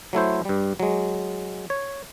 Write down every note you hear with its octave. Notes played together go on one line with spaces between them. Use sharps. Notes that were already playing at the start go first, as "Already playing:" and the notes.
F#3 A3 E4 C5
G2 G3
F#3 G#3
C#5